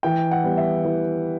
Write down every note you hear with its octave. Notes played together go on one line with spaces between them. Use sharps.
E3 G5
F#5
G3 B3
E5
E3